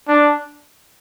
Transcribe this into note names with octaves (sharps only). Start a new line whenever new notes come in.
D4